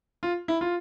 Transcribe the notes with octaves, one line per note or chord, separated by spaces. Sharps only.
F4
E4
F4